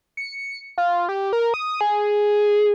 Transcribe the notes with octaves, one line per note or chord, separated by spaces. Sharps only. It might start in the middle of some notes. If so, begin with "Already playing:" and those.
C#7
F4
G4
A#4
D#6
G#4